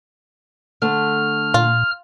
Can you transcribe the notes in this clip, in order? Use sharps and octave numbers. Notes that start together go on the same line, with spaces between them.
D3 A3 F6
A#2 F4